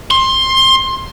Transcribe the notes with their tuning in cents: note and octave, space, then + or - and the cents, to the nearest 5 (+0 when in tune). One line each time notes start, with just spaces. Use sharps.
C6 +20